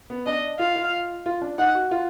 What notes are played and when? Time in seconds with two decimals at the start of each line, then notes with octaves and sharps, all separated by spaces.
0.10 B3
0.26 D4 D#5
0.59 F4 F5
0.76 F4
1.26 F4
1.42 D4
1.58 D#4 F#5
1.75 F#4
1.91 F4